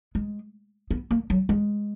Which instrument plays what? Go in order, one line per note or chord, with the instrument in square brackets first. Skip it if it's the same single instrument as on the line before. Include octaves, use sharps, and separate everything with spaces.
[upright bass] G#3
B3
A#3
F#3
G#3